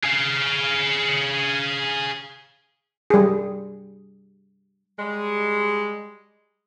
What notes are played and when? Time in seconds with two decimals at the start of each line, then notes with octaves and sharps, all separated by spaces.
0.03 G#4 F5
3.10 G3 G#4
4.98 G3 G#3